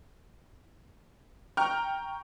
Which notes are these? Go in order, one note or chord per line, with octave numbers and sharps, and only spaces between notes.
G5 A#5 C#6 F6